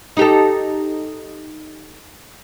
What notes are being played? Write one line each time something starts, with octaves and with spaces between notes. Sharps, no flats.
D#4 G4 A4